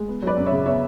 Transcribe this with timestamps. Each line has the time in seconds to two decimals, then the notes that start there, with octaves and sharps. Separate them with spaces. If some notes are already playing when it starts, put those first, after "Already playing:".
Already playing: G#3
0.08 B3
0.22 F#3 B4 D5
0.37 F#2
0.46 C#5 E5
0.52 C#3
0.66 B3 C#5 E5